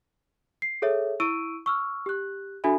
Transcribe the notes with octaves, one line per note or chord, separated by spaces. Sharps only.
C7
G#4 A4 C#5 E5
E4 C#6 E6 D7 D#7
C#6 E6 F6
G4 F#6
D4 F#4 A4 E5 G#5 B5